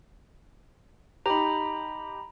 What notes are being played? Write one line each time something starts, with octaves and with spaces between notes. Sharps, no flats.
D#4 G4 A#5 B5